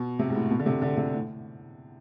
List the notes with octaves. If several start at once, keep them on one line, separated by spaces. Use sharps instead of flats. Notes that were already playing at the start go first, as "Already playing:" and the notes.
Already playing: B2
C3
G#2
A2
B2
D3
C3
D3
C3
A2